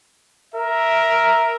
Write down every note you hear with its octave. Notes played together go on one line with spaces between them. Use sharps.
A#4 E5